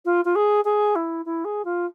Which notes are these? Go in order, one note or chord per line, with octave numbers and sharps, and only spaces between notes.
F4
F4
G#4
G#4
E4
E4
G#4
F4